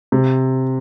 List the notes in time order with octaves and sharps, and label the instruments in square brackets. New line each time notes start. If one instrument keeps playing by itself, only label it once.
[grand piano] C3